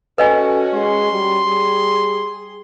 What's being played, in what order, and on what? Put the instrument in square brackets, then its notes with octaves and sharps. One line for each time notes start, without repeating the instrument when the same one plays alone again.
[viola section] C#4 F#4 [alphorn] A4 [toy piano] B4 D#5 G#5
[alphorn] G#3 [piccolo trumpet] C6
[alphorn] G3
[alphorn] G3 [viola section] G#4